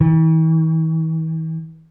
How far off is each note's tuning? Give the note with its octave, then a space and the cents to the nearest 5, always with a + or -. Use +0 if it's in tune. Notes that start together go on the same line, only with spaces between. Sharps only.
E3 -45